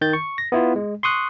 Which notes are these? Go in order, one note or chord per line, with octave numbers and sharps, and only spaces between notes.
D#3 G6 A6
C#6
A#6
B3 E4 F4
G#3
C6 C#6 D#6 F#6